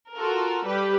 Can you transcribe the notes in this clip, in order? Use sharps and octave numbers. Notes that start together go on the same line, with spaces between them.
F4 F#4 A4 A#4
G3 G4 B4